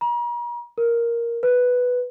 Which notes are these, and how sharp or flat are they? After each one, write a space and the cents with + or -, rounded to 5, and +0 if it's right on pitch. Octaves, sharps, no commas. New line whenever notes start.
A#5 +40
A#4 +5
B4 +0